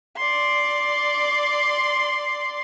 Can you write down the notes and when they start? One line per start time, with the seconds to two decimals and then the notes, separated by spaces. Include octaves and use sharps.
0.17 D5 C6